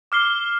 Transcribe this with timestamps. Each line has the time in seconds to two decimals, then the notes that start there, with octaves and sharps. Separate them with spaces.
0.12 D6 F6 C7 G7